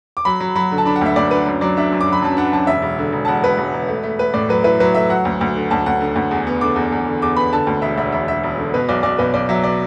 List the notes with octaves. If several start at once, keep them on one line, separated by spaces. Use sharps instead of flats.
D6
F#3 B5
F#3
F#3 B5
D3
A5
D4 B5
F#5
D2 E5
D2 D5
D4 B4
F#2
F#3 D5
D4 E5
F#2
D6
F#3
B5
F#2 A5
D4 F#5
F#2 A5
E1 E5
E1
D3
E1
A5
E1 F#5
E1 B4
E1
E1
A3
A3
A3 B4
A2 D5
F#3 B4
E4 B4
F#3 B4
A3 E5
F#3 F#5
D2
D2
D3
D2 A5
D2 F#5
D3
D2
E2
B3
D3 D6
E2
E2
D3
E2 D6
B3 B5
D3 A5
D2
E1 E5
E1 E5
E1 E5
E1 E5
E1
D3
B2 B4
B1 D5
B1 D5
B1 B4
B1 D5
F#3 E5
D5